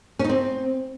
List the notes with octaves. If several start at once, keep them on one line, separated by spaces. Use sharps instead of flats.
C#4
D#4
C4